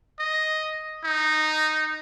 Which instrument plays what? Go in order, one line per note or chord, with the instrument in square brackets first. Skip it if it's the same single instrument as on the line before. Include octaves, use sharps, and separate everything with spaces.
[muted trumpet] D#5
D#4